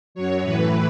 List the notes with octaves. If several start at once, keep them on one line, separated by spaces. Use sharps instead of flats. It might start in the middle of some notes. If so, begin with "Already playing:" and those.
F#2 F#3 C#5
A2 E3 B4